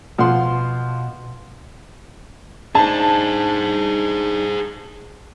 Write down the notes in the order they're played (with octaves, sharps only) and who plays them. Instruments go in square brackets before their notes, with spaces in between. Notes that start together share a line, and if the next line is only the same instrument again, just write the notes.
[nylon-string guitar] B2 F#5 [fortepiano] F3 C6
[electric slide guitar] D4 D#4 [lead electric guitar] G#4 C5 [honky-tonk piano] A5